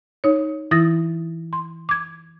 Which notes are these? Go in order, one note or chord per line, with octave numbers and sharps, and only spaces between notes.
D#4 C#5
E3 E4 D#6 A6 A#6
C6
D6 G#6